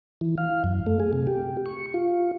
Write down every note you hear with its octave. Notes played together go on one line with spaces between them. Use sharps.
E3
F5
F#2
A3
G#4
C3
G4
C#6
F4